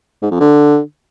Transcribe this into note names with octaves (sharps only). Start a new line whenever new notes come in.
G#2
F2
D3